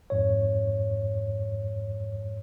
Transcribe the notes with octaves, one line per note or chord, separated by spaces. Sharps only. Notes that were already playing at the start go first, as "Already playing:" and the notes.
F2 G#2 C#5